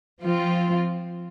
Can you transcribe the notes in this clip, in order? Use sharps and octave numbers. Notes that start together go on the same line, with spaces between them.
F3 C4 F4